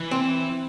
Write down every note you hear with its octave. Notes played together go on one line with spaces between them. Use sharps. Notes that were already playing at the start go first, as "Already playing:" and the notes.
Already playing: E3
C4